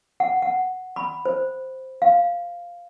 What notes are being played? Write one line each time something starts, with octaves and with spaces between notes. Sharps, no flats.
F#5
F#5
B5
C5
F5